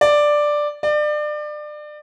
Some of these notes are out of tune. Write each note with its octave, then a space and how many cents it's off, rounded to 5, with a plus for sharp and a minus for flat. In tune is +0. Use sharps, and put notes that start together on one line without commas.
D5 +5
D5 +30